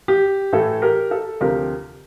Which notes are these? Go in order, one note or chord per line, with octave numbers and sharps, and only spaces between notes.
G4
A2 E3 A3 A4
G4 A#4
A4
D2 C3 F3 G4 A#4